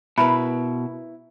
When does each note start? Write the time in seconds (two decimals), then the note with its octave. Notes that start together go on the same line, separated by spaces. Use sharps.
0.18 B2 E4 A#4 B4 B5